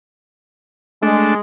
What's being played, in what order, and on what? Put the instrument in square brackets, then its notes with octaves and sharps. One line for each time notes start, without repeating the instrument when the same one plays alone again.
[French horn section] G#3 [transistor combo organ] A3 D4